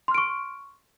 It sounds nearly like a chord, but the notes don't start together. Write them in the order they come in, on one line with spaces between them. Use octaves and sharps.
C6 F6 D7 C#6